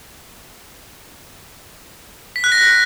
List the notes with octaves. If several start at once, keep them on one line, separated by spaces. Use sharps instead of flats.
B6
F#6
A#6